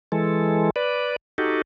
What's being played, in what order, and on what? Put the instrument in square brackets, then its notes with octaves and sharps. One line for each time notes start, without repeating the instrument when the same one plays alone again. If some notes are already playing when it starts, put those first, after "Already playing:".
[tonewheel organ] E3 G#3 A4
B4 D5
D#4 F#4 G4 A4